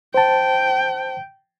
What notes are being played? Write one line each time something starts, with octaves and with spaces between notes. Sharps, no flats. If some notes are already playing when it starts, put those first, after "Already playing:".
C5 G5 A5